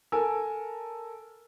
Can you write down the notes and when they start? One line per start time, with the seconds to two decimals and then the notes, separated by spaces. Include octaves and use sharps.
0.12 A4 A#4 G#5 E6